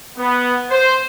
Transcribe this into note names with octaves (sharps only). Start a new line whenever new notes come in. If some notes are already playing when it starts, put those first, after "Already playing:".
B3
C5